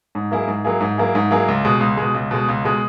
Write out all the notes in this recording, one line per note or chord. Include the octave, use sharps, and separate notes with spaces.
G#2
F#3 A#3 E4 G#4
G#2
F#3 A#3 E4 G#4
G#2
F#3 A#3 E4 G#4
G#2
F#3 A#3 E4 G#4
C#2
B2 G#3
C#2
B2 G#3
C#2
B2 G#3
C#2
B2 G#3